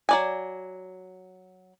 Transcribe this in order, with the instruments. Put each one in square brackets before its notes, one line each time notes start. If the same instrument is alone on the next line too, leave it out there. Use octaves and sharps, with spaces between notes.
[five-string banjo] F#3 D5 G#5